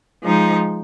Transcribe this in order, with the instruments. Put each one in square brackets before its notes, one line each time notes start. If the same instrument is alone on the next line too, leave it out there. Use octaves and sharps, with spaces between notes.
[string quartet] F3 G#3 D#4